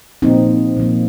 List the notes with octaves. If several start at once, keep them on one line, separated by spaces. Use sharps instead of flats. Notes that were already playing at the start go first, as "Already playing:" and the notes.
A#2 F3 A#3 C4 D#4
A#2 F3 A#3